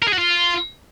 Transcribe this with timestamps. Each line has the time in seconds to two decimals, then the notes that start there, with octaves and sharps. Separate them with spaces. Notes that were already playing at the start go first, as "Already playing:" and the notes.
0.03 A#4
0.08 G#4
0.13 F#4
0.18 F4